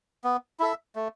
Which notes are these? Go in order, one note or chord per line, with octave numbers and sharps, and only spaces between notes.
B3
E4 A4 E5
A3